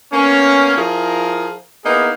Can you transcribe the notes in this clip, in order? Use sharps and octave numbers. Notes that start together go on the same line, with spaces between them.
A#3 B3 C#4
F3 E4 G#4 A#4
A#3 B3 D#4 E4 G#4